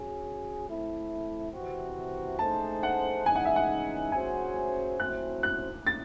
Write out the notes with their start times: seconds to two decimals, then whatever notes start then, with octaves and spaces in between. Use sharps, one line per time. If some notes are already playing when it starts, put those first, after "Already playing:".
Already playing: F#3 C#4 G#4
0.66 A3 C4 E4
1.52 C3 E3 C4 F#4
2.39 A3 D#4 G#4 C5 A5
2.83 F#5
3.26 C#3 E3 G#3 D#4 G#5
3.35 F#5
3.45 E5
3.56 F#5
4.12 F#3 C#4 G#4 C5 G#5
4.99 F#3 A3 C4 E4 C5 F#6
5.43 F#6
5.87 A6